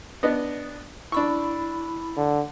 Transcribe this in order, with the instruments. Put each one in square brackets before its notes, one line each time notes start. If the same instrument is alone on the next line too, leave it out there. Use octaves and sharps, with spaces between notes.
[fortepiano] B3 D4 D#5
[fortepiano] D4 C#6 [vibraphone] E4 B5
[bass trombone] D3